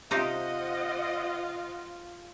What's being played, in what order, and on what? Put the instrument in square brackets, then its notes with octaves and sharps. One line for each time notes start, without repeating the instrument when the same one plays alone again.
[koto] C3 D#4 G4 [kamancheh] F4 [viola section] C5 D#5 F#5